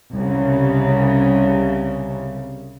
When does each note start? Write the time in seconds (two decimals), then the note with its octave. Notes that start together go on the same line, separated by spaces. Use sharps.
0.13 C2 C#3